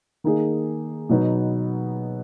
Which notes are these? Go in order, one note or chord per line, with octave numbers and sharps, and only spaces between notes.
D#3 A#3 D#4 G#4
B2 F#3 B3 D#4